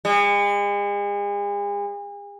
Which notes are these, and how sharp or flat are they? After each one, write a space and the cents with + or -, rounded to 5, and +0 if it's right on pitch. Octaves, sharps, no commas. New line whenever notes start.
G#3 -40